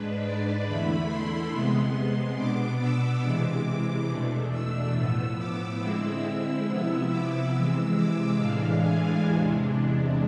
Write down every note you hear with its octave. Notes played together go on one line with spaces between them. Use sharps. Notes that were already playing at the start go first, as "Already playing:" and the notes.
Already playing: G#2 G#3 D4 B4
D5
E2 D3 A3 E4 B5
C6
C3 G#3 B3 C6
B2 B3 D4 D6
E6
C3 E3 G#3 D6
E2 B2 A3 D4
E6
A2 F3 B3 E6
D6
D3 G#3 C4 E4 E6
C3 F3 B3 E4 E6
D6
C3 E3 G#3 E6
D6
A2 E3 G#3 D4 F5
G#5
E2 C3 G#3 D4